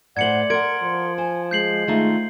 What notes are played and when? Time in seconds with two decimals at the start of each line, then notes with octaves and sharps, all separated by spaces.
0.17 A2 C5 D5 F#5 G#6 C#7 F#7
0.50 A#4 F#5 C6 G#6 D7
0.82 F3
1.18 C5 G#5
1.51 G#3 G6 C7 F#7
1.87 D#3 A3 D#4 F4